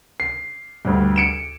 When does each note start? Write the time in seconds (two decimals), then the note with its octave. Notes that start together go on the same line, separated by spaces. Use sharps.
0.20 C7
0.85 D2 G2
1.16 C#7 D7 E7